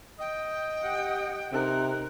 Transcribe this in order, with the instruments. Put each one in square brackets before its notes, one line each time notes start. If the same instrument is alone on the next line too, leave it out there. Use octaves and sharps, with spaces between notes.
[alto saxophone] D#5 [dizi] G5
[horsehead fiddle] G4 F#5
[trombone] C3 [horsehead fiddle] D#4 A#4 [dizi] F#6